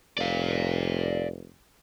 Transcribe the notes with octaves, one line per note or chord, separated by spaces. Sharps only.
F1 D5 F5